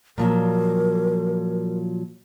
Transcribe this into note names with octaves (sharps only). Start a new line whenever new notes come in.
A#2 F3 F#3 A#4